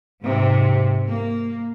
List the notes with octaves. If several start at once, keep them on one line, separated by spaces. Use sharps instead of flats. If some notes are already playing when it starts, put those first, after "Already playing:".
G#2 C3
A#3